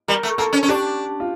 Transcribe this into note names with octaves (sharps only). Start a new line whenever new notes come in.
G3 A#4
A3
A#3 A4
C#4
C#4
D4 G4
F4